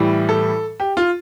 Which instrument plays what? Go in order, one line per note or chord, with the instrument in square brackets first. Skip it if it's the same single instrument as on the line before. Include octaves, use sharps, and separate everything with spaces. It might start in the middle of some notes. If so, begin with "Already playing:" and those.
Already playing: [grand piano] A2 E3 G3
A4
G4
F4